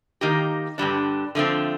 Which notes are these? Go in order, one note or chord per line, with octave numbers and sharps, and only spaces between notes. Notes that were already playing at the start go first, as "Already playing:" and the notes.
D#3 A#3 D#4 G4
G2 D3 G3 D4
D3 F3 A3 C4